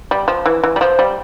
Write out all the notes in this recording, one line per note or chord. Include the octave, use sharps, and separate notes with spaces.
G3
F3
E3
E3
G3
F3 C5
G3